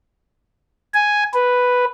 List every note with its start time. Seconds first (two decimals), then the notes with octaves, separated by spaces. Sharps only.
0.94 G#5
1.34 B4